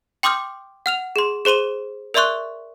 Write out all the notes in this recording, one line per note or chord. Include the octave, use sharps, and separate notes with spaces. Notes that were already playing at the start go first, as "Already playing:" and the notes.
G5 C6 D6 D#6 F6 G6
F#5 F6 F7
G#4 C6
G#4 C5 C6 D#7 G7
A#4 D5 E5 C6 C#6 F#6